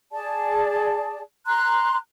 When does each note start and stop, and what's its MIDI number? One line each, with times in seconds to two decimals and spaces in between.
0.12 1.21 68
0.12 1.21 74
0.12 1.21 81
1.46 1.97 82
1.46 1.97 84
1.46 1.97 90